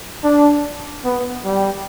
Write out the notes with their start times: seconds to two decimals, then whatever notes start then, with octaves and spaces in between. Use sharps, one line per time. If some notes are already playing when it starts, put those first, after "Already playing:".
0.24 D4
1.04 B3
1.45 G3